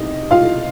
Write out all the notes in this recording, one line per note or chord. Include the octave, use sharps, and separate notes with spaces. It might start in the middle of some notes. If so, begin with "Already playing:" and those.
Already playing: C3 D#4 D#5
F4 F5